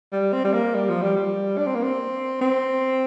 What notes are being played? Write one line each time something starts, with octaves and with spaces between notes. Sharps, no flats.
G3
C4
G3
A#3
G3
F3
G3
G3
D4
C4
A#3
C4
C4